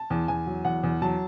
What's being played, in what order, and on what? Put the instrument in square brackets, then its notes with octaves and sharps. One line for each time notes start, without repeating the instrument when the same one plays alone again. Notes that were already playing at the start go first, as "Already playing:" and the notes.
Already playing: [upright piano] A5
E2
E2 G#5
F#3
E2 F#5
E2
F#3 A5